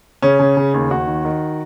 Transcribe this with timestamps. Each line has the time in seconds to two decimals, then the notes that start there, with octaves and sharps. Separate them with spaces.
0.22 C#3 C#4
0.40 C#3
0.57 C#3
0.74 D#2
0.91 D#2 F#4
1.07 D#3
1.25 D#3